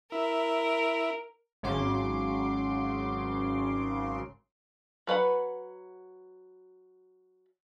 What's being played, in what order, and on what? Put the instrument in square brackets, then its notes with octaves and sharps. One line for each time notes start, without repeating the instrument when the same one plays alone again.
[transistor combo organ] E4 [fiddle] A#4
[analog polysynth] G#1 C#3 F#3 C6 D6
[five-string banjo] F#3 B4 F#5 B5